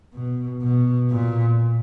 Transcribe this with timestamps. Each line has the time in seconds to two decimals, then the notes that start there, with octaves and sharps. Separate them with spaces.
0.14 B2
0.62 B2
1.10 A#2